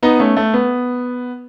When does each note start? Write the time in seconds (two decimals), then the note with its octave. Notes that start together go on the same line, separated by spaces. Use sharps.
0.03 B3 D#4
0.19 A3 C#4
0.37 A3
0.54 B3